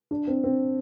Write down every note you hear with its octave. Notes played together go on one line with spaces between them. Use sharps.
D4
C4
C4